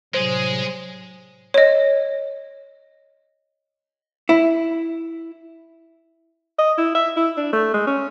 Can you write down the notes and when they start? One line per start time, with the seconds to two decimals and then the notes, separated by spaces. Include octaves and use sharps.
0.14 A2 C3 F#3 G#3 G#4 C5
1.54 C#5 D#5
4.29 E4
6.59 D#5
6.78 E4
6.95 E5
7.16 E4
7.37 D4
7.53 A3
7.74 G#3
7.87 C#4